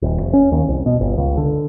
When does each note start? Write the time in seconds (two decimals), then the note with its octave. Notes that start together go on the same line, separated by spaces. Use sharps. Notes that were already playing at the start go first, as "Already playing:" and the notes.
0.02 D#1
0.20 F1
0.33 C#4
0.52 D#2
0.68 C2
0.86 B2
1.00 G1
1.18 C#2
1.37 D3